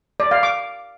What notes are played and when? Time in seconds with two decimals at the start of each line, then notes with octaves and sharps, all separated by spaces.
0.20 D5
0.31 F5
0.43 D6